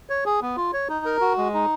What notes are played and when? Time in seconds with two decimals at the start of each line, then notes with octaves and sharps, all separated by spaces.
0.10 C#5
0.25 G#4
0.42 B3
0.57 F4
0.73 C#5
0.89 D#4
1.05 A#4
1.21 F#4
1.38 G#3
1.54 D#4